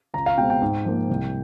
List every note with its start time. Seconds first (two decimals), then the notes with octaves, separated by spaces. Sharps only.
0.14 C#2 A#5
0.26 F5
0.38 B2 G#3 C4 G5
0.50 G5
0.62 G#2
0.85 F3 A#3
1.09 C2